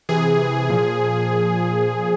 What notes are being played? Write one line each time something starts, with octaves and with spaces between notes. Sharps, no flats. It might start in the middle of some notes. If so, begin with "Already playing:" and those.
C3 E3 G#4
A#2 F3